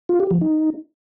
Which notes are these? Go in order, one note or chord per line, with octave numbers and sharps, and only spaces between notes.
F4
G4
F3
D#4